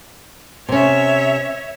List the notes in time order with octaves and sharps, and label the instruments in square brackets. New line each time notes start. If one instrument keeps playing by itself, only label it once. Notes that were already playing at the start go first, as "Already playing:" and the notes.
[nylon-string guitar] C3 C#4 [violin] C#5 E5